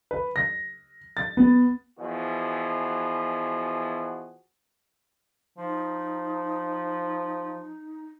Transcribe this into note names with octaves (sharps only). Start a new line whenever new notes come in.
B4
A#6
A6
B3
B2 E3 F3 F#4 G#4
F3 D#4